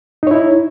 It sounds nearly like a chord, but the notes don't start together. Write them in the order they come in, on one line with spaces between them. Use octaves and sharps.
D#4 C#5 E4